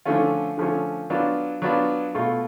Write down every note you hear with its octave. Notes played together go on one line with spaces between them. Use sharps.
D3 F3 A3 C#4 F4
D3 F3 A3 C#4 F4
F#3 B3 D4 F4
F#3 B3 D4 F4
B2 A3 F4